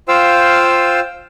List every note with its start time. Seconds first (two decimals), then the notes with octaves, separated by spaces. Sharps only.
0.08 F4 C5 F5 G5 E6